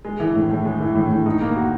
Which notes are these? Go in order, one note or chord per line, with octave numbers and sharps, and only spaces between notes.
G#3
E3
A2
A2
G#3
E3
A2
A2
D#4
A#3
F#4